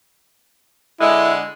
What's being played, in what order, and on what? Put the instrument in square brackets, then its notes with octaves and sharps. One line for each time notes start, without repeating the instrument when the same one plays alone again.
[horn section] D3 G#3 [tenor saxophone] E4